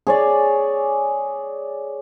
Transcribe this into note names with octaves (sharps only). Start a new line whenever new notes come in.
G#4 C#5 D5